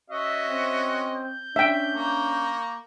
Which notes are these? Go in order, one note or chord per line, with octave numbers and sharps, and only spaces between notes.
C#4 F#4 D#5 E5
C4
G6
C#4 D4 E5 G5
A#3 A#5 C#6